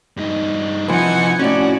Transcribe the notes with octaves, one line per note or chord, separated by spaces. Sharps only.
G2 D#4
C2 F3 D#4 E4 B4 F#5 G#5
A2 C#4 F#4 D5